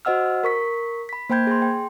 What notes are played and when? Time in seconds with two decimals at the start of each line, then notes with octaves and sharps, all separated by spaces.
0.05 F#4 C5 D#5 F#5 E6 F6
0.44 A#4 C#6 B6
1.09 B5 B6
1.30 A#3 C5 G5 B5 G6 G#6
1.47 G#4 C6
1.62 G5